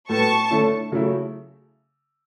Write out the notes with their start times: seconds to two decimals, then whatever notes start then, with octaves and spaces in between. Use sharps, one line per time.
0.09 A2 F#3 B3 A5 C#6
0.51 D3 A3 C#4 E4
0.92 C#3 F#3 A3 E4